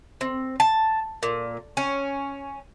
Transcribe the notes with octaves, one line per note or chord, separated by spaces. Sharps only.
C4
A5
A#2
C#4